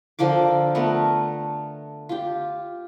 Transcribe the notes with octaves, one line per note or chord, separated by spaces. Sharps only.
D3 F3 A#4 D6
A3 B3 A#4
F4 G4